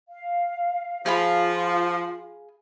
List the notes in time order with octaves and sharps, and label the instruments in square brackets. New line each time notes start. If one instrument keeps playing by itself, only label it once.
[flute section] F5
[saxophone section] F3 [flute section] F4 [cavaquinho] G#4 F5 B5